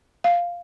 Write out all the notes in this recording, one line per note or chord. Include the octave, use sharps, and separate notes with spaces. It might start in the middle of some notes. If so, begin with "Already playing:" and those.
F5